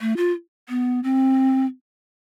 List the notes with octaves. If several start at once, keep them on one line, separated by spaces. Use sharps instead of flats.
A3
F4
B3
C4